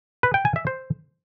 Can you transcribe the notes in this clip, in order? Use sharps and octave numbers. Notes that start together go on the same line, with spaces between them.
B4
G5
G#5
E5
C5